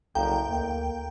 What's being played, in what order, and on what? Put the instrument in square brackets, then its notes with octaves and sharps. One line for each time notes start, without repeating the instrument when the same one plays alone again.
[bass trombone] F#1 [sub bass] C2 [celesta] A4 F5 A#5 [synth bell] G5
[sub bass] D2 [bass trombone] A#3